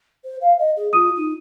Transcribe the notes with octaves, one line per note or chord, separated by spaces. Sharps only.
C5
F5
D#5
G#4
F4 D#6 D#7
D#4